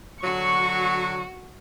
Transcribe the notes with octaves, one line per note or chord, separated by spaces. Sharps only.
D3 F#3 F#4 C#6